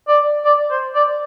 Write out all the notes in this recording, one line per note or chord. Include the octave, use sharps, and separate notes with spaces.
D5
D5
C5
D5